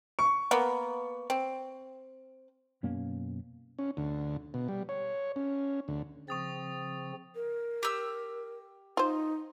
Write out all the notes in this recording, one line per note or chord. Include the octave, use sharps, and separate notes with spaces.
C#6
A#3 B3
C4
F#2 B2 A#3 C#4
C#4
D2
B2
G3
C#5
C#4
D2
C#3 F3 C4 C#6 D#6 A6
A#4
G4 E6
D#4 F4 C5